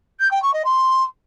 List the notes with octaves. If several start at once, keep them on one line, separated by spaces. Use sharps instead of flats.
G6
G5
C#6
D#5
C6